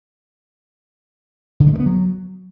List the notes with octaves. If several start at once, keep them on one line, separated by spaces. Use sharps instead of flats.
D3
G#3
A3
B3
F#3